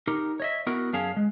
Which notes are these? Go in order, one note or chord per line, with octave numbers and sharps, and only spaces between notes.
D#4 G4 A#4
C#5 D#5 E5
B3 E4 F#4 A#4
F#2 C#4 G#4 F5 A5
G#3